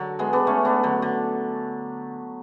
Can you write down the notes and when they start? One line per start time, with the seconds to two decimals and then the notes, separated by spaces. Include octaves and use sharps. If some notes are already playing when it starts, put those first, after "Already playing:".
Already playing: D3 F#3
0.19 G#3 B3
0.33 B3 D4
0.47 A3 C#4
0.65 B3 D4
0.83 D3 F#3
1.02 D3